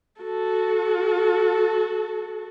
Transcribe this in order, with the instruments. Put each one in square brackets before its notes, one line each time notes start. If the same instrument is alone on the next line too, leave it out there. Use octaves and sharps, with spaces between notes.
[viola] F#4 A4